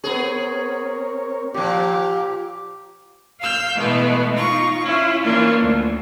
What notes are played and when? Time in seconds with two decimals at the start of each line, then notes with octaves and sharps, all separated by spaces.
0.04 B3 C4 G#4 A#4 C#5
1.54 A#2 F3 G4
3.40 F5 E6 F6 G6
3.77 B2 E3 G#3 A3 B3
4.34 D#4 F4 C#6
4.83 C#4 E4 F4
5.22 E3 A#3 C#4 D4 F4
5.61 D2